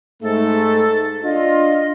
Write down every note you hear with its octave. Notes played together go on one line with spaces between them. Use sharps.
G#2 A3 A4
D4 F4 D#5